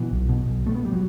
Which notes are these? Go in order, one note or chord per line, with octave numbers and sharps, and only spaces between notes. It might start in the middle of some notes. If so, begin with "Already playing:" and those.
Already playing: B2 E3
B1
B2
B1
B2 A3
B3
G3
F#3